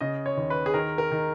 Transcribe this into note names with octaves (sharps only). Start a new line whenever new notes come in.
C#3 D#5
C#5
D#2
B4
G#4
D#3 A#4
A#4
D#3